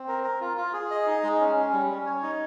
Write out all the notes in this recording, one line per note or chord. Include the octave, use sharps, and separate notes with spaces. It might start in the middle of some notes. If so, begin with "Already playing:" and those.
Already playing: C4
A#4
A#4
F4
F4
G#4
D#5
D#4
G#3
C#4
C#4
G3
C#4
C#5
D#4